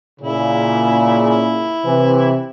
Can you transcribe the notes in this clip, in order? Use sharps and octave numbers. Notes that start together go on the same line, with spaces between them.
A#2 C#3 E4
E4
C3 E3